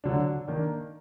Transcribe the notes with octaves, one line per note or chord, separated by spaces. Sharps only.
D3 F#3 D4
D#3 A#3 D4